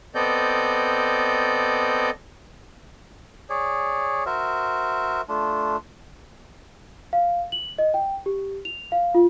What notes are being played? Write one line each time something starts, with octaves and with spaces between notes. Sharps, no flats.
B3 C4 A4 D5 D#5 G6
G#4 C#5 D5
F#4 A#4 C5 E5
A3 D4 F4
F5
F#7
D#5
G5
G4
F7
F5
F4